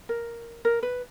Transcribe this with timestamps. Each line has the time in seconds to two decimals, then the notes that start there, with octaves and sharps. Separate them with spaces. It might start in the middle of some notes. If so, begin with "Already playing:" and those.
0.09 A#4
0.65 A#4
0.83 B4